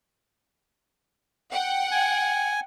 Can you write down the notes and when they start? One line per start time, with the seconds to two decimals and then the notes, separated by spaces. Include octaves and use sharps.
1.51 F#5 G5
1.91 G#5